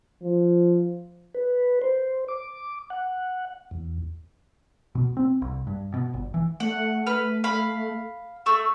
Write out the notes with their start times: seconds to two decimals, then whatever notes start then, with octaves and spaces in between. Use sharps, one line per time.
0.22 F3
1.34 B4
1.82 C5
2.28 D6
2.90 F#5
3.71 E2
4.95 B2
5.17 C4
5.42 C2
5.67 G2
5.94 B2
6.14 G1
6.34 E3
6.60 A3 F#5
7.06 B4 F6
7.44 F5 B5
8.46 A3 C#6 E6